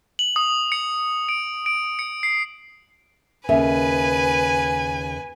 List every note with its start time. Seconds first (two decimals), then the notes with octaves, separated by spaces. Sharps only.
0.19 F#7
0.36 D#6
0.72 C#7
1.29 D7
1.66 D7
1.99 C#7
2.23 C7
3.49 D#2 C#3 B4 E5 G#5